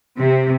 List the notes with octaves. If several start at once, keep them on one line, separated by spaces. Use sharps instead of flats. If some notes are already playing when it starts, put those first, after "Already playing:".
C3